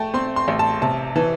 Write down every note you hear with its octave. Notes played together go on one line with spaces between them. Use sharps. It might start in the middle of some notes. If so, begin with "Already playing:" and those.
Already playing: A3 G5 A5
C4 C6
C6
A1
A5
C3 A5
E3 A5